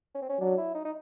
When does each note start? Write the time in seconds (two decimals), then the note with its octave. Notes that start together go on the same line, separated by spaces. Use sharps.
0.15 C#4
0.22 C4
0.29 C#4
0.40 F#3 D4
0.57 E4
0.75 D#4
0.85 D#4